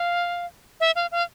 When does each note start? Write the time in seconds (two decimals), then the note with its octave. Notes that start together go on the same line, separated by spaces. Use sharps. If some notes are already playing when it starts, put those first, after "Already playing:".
Already playing: F5
0.80 E5
0.96 F5
1.12 F5